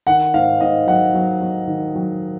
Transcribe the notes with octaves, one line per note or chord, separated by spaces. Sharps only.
D#3 F#5
G#2 F5
G#2 D#5
F#3 F#5
F#3
F#3
D#3
F#3